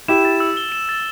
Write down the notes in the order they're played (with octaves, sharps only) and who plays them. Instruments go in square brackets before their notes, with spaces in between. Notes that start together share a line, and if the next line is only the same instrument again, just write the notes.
[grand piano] E4 G4 [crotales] E7
[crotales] A6
E6
G7
E7
A6